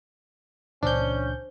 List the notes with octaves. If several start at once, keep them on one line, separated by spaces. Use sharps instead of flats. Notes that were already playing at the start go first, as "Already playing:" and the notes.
C#2 A#2 E3 C#4 D4 C5 G6